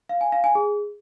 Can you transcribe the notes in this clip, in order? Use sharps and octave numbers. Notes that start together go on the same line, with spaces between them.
F5
G#5
F5
G#5
G#4